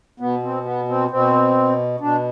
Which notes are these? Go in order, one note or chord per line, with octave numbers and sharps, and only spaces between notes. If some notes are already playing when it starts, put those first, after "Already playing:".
B2 B3
C4
B3
C4
B2 C4
B2 D4